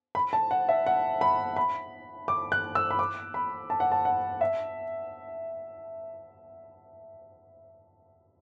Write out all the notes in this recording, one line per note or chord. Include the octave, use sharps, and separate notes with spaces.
B5
A5
F#5
E5
F#5
B5
B5
D6
F#6
E6
B5
D6
B5
A5
F#5
A5
F#5
E5